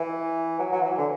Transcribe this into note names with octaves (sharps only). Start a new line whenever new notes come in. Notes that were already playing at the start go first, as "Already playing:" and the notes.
Already playing: E3
F#3
F#3
E3
D3